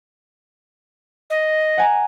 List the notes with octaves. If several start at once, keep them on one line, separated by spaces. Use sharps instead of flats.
D#5
F#5 G#5 A#5